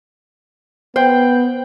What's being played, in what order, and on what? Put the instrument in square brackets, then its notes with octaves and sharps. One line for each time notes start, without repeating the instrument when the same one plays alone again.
[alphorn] B3 [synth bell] C5 [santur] G5